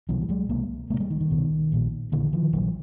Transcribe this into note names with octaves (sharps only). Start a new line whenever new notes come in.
C2 B2 E3 F#3
G3
F#3 G#3
C2 B2 G#3 A#3
C2 B2 G#3 A#3
G3 A3
D#3
D#3
C2 B2
A#1 A#2
A#1 A#2 D3 E3
D#3 F3
A#1 A#2 E3 F#3